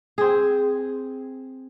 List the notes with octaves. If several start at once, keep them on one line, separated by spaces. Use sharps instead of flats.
C4 G#4